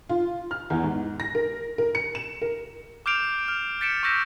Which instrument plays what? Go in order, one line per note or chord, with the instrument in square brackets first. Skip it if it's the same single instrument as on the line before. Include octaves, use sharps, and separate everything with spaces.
[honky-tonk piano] F4
F6
E2
G#2
A#6
A#4
A#4
C#7
E7
A#4
[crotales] D6 F6 G6 C7 D7 F7
F6
G6 A6 B6 C#7 D7 E7
C#6 E6 G6 A#6 B6 E7